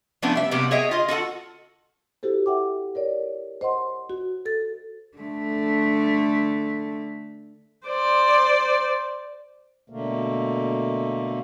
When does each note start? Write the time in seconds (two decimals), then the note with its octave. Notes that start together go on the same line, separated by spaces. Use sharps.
0.22 F3 A3 B3 C#4 D4 E4
0.35 G3 E5
0.51 C3 F#3 G3 A#3 B3 G4
0.71 G#4 C#5 D#5 E5 G5
0.91 F4 D#5
1.08 F4 F#4 A4 F#5
2.23 E4 F#4 G4 A4 C5
2.46 E5 F#5 G5 D6
2.95 A#4 C#5 D5
3.61 C5 D#5 F#5 C6
4.10 F#4
4.45 A4 A6
5.18 D3 A3
7.88 C5 D5
9.90 B2 D3 A3 A#3